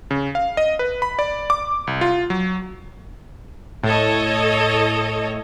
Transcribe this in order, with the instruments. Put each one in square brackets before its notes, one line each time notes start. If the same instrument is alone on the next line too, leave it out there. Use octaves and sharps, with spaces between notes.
[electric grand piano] C#3
F5
D#5
B4
B5
D5
D6
C2
F4
F#3
[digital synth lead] A2 [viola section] A4 C#5 D#5